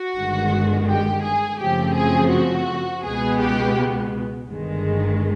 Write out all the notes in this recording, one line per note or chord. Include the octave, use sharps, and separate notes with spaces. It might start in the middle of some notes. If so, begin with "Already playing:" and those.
Already playing: F#4
G1 G2 D#3 G#3
G4
G#4
F#2 C#3 F3 A3 C4 G4
G#4
F#4
C#2 B2 G#3 B3 G#4
G4
G1 G2 D#3 G#3